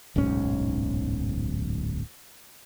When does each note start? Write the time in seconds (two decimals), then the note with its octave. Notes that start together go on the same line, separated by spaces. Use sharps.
0.16 D1 B1 G#2 C#4